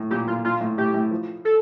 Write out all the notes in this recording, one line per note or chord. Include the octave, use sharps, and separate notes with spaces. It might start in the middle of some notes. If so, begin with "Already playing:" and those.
Already playing: A2
A#2 G4
A#2 F4
A#2 F4
A2
A2 G4
A2
F3
A4